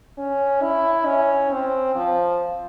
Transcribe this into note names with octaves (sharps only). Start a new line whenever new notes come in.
C#4
E4
C#4
C4
F3